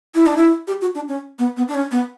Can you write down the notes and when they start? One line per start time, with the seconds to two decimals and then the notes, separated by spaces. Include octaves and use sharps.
0.15 E4
0.26 D4
0.37 E4
0.67 G4
0.81 F#4
0.95 D4
1.08 C#4
1.39 B3
1.57 B3
1.68 D4
1.75 C#4
1.91 B3